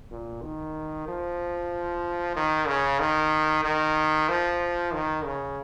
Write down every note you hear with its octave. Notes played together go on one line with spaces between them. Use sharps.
A#2
D#3
F3
D#3
C#3
D#3
D#3
F3
D#3
C#3